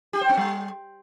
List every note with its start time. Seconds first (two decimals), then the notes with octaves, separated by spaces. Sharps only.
0.13 G4
0.21 C5
0.29 C4
0.37 G3